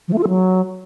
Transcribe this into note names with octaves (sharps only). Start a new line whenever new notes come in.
F3
A3
F4
A4
F#3